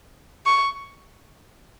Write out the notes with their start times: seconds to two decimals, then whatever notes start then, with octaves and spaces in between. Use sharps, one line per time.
0.46 C#6